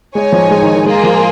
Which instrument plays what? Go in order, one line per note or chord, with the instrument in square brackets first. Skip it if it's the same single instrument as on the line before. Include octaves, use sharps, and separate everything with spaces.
[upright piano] G#3 [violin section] D#4 C#5 G#5
[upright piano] F3
G#3
D#3
D#3
[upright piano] G#3 [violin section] A#3 F4 G#4
[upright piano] F3